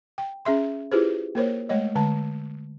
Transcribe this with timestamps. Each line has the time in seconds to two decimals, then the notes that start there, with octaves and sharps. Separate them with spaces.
0.18 G5
0.45 C#4 G#4 E5 C6
0.92 E4 F4 G4 G#4 B4 C5
1.35 A#3 A#4 C5 C#5
1.69 G#3 A3 C#5 D#5
1.95 D3 G#3 A5